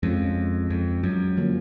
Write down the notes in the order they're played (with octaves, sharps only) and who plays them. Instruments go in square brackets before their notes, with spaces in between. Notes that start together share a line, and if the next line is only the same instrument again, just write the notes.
[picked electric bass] F2 [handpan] G#3 C#4 F4
[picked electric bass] F2
F#2
[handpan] D3 F3 A#3 C#4